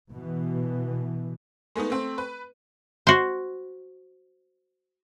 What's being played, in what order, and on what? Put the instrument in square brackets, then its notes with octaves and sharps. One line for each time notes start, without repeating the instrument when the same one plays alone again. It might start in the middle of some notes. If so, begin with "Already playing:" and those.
[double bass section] B2 E3
[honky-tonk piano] G#3 A3 B3 D#4
A3 C4
B4
[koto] F#4 C5